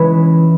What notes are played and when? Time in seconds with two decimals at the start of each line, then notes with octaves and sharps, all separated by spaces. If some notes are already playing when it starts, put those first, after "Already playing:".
Already playing: E3 G#3 C#4 E4